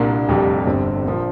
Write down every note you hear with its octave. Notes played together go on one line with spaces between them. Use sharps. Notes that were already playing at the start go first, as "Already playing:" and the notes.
Already playing: C2 A#2 A#3 D4
F1 F2 C3 G3
G1 G2 G3 C4
A#1 A#2 F3 A#3